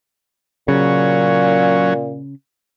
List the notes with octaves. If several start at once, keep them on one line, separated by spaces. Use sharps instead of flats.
A#2 C#3 F#3 C#4